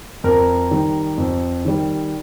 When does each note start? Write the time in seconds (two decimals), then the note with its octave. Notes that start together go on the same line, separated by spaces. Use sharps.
0.24 F2 A#4
0.71 D#3 G3
1.18 F2
1.65 D#3 G3